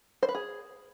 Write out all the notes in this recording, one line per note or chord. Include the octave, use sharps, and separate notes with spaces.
C5
B4
G#4